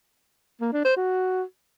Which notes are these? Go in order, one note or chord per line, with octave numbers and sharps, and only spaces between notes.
A#3
D4
C5
F#4